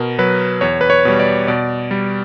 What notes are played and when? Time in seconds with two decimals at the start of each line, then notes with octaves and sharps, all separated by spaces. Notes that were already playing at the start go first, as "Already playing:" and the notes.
Already playing: B2 A#4
0.19 F#3 B4
0.61 E2 C#5
0.81 B4
0.90 C#5
1.05 B2 G3
1.20 D5
1.48 B2 D5
1.91 G3